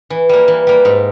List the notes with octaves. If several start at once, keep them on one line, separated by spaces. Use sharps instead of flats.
E3
G3 A#3
E3
G3 A#3
G#2